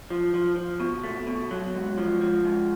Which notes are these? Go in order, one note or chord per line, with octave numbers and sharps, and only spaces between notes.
F3
F3
F3
B2
A3
B2
F#3
G#2
F3
F3
G#2